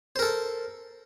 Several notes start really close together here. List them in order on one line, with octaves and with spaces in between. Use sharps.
C5 A#4 A4